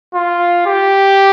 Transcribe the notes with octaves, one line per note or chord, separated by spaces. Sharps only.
F4
G4